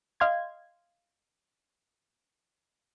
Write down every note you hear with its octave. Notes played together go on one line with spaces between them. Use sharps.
D#5 F5 C6 G#6